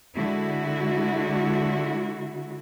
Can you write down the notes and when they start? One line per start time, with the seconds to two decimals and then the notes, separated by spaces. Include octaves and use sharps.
0.15 D3 G#3 E4 F#4